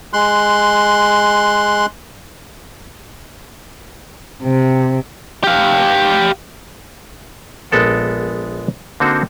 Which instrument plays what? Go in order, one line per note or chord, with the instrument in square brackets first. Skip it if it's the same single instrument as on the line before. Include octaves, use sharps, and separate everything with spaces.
[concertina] G#3 C6 F#6
[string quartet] C3
[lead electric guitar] G4 F5
[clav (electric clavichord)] A#1 G#3 B3 A4 A#4 F#5
D3 A#3 C4 D#4 F#4 C5